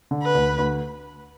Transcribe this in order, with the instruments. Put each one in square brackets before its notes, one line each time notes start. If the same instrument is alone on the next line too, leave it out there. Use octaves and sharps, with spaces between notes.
[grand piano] D3
[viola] B4
[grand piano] D2
D2